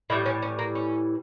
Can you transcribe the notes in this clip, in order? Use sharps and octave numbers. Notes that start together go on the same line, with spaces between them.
A2 E3 G3 E4
C#4
C#4
A#3
C#4